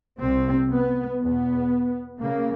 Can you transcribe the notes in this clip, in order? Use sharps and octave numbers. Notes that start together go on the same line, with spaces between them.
C2 C3 C4
B3
E2 B2 B3
C#3 A#3